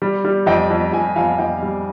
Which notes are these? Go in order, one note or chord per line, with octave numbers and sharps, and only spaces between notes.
G3
G3
F2 D#5 G5
F2
F2 G#5
F2 F5 G#5
F2 D#5 G5
G3